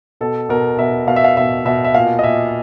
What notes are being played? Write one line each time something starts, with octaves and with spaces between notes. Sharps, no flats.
B2 A4
B2 A#4
B2 E5
B2 F5
E5
F5
B2 E5
B2 E5
E5
A#2 F5
D#5
A#2 E5